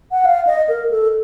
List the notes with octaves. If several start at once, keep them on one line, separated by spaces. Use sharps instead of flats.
F#5
F5
D#5
A#4
A4